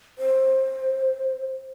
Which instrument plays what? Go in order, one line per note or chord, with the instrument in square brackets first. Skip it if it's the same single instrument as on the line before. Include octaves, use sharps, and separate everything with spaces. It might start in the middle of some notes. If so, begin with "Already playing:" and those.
[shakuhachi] C5